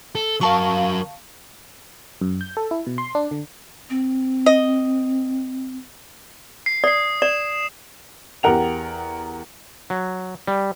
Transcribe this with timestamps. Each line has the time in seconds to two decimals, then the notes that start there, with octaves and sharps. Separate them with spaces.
0.15 A4
0.41 F#3 A#4 F5 A5 C#6
2.21 F#2
2.41 G6
2.57 A4
2.71 E4
2.86 B2
2.98 C6
3.15 D4
3.31 D3
3.90 C4
4.46 D#5
6.66 C7
6.84 D5 D#6 C7
7.22 D5 E7
8.43 E2 G4 A#4 F#5 F7
9.90 F#3
10.47 G3